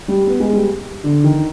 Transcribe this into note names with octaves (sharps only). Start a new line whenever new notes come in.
G3
B3
G#3
G3
D3
D#3